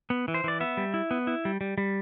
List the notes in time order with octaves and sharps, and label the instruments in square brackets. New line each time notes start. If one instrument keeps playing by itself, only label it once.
[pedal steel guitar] B3
E3
C5
E3 D5
B3 E5
G3
E4
B3
E4
G3
G3
G3